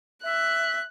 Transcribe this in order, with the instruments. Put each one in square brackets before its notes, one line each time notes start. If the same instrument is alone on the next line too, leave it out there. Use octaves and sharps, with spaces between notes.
[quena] E5 [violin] F#6